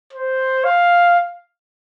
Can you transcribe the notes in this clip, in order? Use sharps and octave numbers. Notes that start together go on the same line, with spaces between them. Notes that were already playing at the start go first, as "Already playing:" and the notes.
C5
F5